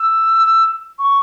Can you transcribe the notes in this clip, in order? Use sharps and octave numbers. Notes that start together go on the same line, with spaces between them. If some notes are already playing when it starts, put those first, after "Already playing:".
Already playing: E6
C#6